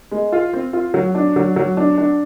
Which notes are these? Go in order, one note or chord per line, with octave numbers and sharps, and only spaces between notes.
G#3
F4
C4
F4
F#3
D4
F#3
F#3
D4
D4